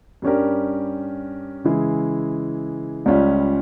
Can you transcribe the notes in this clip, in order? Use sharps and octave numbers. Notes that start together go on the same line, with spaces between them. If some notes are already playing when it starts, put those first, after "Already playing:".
G2 G3 C#4 G4 A#4
C#3 E3 G#3 E4 G#4
C#2 C#3 G3 C#4 F4